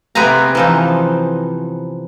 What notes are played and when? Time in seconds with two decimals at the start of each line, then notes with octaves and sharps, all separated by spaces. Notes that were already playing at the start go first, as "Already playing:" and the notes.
0.15 C3 B3 C4 G#4 G#5 A#5
0.55 E3 F3 D#4